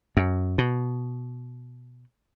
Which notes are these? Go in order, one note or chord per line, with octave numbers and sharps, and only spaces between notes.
F#2
B2